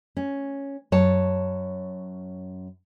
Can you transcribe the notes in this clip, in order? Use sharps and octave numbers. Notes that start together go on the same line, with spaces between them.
C#4
F#2 C#5 A5